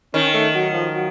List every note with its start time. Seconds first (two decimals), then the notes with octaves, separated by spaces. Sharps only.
0.14 D#3 C#4
0.34 A3
0.54 F#3
0.73 F3
0.94 F#3